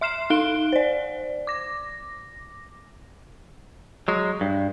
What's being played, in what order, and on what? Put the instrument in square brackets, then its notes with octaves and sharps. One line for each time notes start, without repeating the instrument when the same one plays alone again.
[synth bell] E5 C6 F6 C7 E7
D#4 F5 F#6 D7 G7
C5 D5
D6 A#6
[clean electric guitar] F#3 G#3
G2